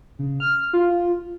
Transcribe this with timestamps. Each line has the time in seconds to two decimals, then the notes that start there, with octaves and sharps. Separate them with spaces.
0.19 C#3
0.40 F6
0.73 F4